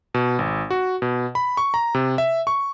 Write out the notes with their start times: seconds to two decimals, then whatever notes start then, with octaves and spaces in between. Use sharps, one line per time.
0.14 B2
0.39 G#1
0.71 F#4
1.02 B2
1.35 B5
1.57 C#6
1.74 A#5
1.94 C3
2.18 E5
2.47 C#6